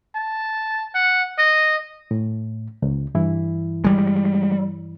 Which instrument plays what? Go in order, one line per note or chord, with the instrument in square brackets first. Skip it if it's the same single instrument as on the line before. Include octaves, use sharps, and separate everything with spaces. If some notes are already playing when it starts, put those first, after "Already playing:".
[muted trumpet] A5
F#5
D#5
[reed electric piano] A2
C#2
G2 E3 E4
[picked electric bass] G3 G#3